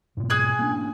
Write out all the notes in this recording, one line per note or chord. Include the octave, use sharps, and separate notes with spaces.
G#2 B2
G#4 G#5 F#6
A#3 C#4 D4